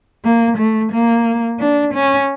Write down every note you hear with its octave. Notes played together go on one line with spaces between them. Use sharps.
A#3
A3
A#3
D4
C#4